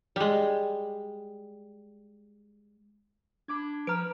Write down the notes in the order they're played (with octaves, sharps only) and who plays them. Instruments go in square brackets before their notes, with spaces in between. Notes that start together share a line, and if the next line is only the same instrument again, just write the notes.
[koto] G3 G#3
[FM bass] D4 [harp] B5 D6 G#6
[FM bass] F3 [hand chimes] B4 F6 [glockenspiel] A#5 D7